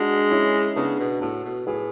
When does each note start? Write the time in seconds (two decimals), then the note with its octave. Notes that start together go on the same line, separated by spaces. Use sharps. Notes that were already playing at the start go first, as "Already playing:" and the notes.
Already playing: G#3 D4 F#4
0.31 C#4 E4
0.76 C#3 B3 D4
1.00 B2
1.21 A2 F#4 A4
1.45 B2
1.67 A2 G#4 B4